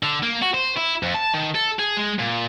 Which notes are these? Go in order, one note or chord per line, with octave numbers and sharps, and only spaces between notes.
D3
A#3
F#4
C5
E4
F2
A5
D#3
A4
G#4
G#3
A#2